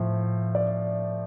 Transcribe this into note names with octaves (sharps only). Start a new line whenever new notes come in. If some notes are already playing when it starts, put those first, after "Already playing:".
Already playing: A2 F3
D5